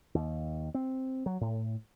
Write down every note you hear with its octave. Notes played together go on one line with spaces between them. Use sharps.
D#2
C4
F#3
A2